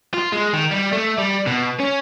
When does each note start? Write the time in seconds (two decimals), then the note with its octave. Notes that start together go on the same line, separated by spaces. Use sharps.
0.14 F4
0.32 G#3
0.53 D#3
0.71 G3
0.93 A3
1.18 G3
1.47 B2
1.80 C#4